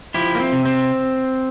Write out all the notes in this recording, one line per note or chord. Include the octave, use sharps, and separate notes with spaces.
F3 E4 G4
A#3
C4
C3
C4